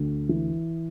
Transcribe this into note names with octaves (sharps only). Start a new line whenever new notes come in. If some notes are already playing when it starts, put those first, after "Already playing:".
Already playing: D2
E3